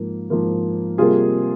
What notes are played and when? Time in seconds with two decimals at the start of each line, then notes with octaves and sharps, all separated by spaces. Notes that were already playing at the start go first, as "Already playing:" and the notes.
Already playing: G#2 F3 A#3
0.30 G#2 F3 A#3
0.98 C3 G3 A#3 F4 G#4